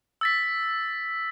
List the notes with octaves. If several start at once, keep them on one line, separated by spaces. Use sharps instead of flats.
E6 A6 B6